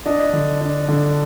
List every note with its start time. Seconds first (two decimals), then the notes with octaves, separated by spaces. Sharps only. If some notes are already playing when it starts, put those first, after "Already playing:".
0.06 D4 D#5
0.33 D3
0.61 D4
0.88 D3